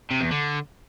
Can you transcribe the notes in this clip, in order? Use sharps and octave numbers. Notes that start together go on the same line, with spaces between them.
C3
E2
D3